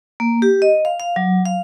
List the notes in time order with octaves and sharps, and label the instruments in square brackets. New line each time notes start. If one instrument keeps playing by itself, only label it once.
[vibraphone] A#3
G4
D#5
F5
F5
F#3
F5